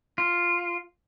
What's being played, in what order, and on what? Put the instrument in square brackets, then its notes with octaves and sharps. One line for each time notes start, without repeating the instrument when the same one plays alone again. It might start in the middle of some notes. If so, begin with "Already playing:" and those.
[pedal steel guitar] F4